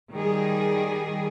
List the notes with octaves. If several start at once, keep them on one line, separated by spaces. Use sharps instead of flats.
D#3 G3 G#4